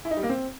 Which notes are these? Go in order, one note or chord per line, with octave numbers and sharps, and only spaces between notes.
E4
D#4
G3
A#3
C4